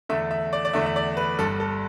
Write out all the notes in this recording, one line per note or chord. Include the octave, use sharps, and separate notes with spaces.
E2 D3 A3 E5
E5
D5
D5
E2 D3 A3 E5
E5
D5
B4
G1 G2 G3 A4
A4